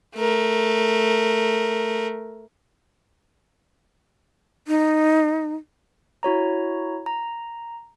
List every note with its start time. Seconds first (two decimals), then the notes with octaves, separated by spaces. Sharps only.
0.15 A3 A#4
4.68 D#4
6.23 E4 F#4 C#5 A#5
7.06 A#5